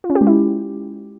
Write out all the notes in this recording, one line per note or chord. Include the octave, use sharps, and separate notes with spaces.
F4
C#4
G4
G#3
E4